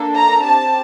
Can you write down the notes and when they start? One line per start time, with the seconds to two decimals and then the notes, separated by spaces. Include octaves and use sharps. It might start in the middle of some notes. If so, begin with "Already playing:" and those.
Already playing: A#3 D4 A4
0.17 A#5
0.46 C4 G4 A5